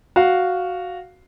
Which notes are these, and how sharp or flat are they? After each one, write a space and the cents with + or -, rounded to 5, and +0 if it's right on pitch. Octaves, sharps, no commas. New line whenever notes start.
F#4 +0 F5 +0